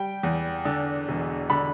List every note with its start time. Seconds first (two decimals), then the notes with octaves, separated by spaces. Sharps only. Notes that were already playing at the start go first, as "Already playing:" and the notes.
Already playing: G3 G5
0.23 E2
0.65 D3
1.08 E1
1.50 D3 B5